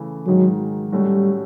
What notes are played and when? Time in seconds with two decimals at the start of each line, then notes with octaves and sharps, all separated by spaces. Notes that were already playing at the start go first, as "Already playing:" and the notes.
Already playing: C#3 E3 A3
0.26 G#2 D#3 F#3 G#3
0.92 A2 F#3 G3 A3 C#4 F#4